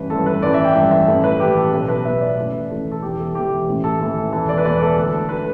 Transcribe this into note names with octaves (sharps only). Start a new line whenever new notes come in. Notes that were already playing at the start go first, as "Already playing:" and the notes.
Already playing: A1 G2 E3 B4
A1 G2 E3 A4
B4
A1 G2 E3 D5
E5
G5
A1 G2 E3 E5
E5
A1 A2 E3 A4
B4
A1 A2 E3 G4
A4
B1 B2 B4
B4
B1 B2 E5
D5
A1 A2 E3
A1 A2 E3 A4
A4
E1 E2 E3 G4
A4
E1 E2 E3 G4
A1 A2 E3
A4
A1 A2 E3
E1 E2 E3 A4
D5
B4
E1 E2 E3 D5
A4
D2 D3
D3 B4